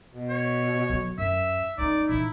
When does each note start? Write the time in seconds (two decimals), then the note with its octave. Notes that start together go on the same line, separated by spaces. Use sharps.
0.12 B2
0.29 C#5
0.89 D3 F#3
1.18 F#2 E5
1.78 F#2 G#3 D#4 D5
2.09 A#2 E3 E4